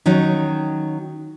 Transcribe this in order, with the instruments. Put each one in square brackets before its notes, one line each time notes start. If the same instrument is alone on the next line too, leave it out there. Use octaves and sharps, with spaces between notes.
[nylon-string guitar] D#3 F#3 C#4 D#4